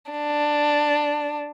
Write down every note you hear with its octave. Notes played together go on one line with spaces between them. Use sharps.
D4